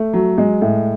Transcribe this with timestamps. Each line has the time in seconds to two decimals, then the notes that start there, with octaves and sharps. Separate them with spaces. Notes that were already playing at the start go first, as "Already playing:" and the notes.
Already playing: A3
0.13 F#3
0.38 G#3
0.62 A2